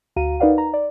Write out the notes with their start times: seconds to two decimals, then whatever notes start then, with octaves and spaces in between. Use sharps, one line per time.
0.16 D2 F#4 F5 A#5 D#7
0.40 D#4 A#4 B4 D5 F5 F#5
0.58 A#5
0.74 D5